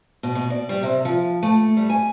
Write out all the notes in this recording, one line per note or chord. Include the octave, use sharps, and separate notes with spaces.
B2
B2
D5
G3
C3
F3
A3
G3
G#5